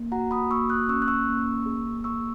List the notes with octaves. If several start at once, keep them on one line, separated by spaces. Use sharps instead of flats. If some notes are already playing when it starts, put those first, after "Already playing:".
Already playing: A#3
F#4 F#5 A#5
B5 D#6
A#3 C#6 E6
D#6 F#6
C#4 C#6 E6
F#6
C#6 E6
A#3
G#4
A#3 C#6 E6